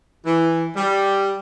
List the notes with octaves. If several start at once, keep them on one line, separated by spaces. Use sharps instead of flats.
E3
G3